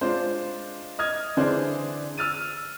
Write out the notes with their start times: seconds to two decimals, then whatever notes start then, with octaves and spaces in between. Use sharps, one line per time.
0.01 G#3 D4 F4 C5
0.98 D#5 D#6 F6 G#6
1.37 D3 E3 D4 G#4 C5 D5
2.17 E6 F6 A6 D#7